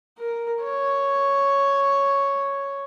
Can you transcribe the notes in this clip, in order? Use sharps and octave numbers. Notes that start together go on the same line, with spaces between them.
A#4
C#5